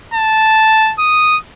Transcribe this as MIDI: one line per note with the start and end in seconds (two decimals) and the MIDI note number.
0.14 0.93 81
0.99 1.37 87